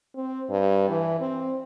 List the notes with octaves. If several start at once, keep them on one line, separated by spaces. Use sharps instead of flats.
C4
G2
E3
C4